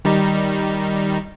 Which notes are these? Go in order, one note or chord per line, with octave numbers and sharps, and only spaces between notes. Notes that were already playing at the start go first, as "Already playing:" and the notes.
D#3 G3 D#4